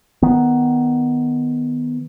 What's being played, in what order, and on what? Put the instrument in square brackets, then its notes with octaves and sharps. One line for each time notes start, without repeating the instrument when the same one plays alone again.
[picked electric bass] D#3 B3